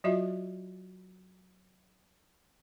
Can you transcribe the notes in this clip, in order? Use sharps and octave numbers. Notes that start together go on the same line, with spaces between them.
F#3 F4 F#4 D#5 E5